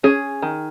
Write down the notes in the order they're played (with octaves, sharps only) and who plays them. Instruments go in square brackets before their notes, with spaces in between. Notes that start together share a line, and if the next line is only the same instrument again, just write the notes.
[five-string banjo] C#4 G#4
D#3